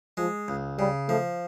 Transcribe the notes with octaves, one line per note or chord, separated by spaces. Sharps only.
F3 G#3
C#2
C#3 G3
F3 A3